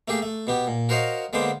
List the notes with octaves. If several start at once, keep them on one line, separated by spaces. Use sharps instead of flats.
A3 A#3 G4 G#4
A3
B2 B3 G4
A#2
F#4 A#4 C5 C#5 D#5 F5
D3 G#3 A#3 B3 C5 D6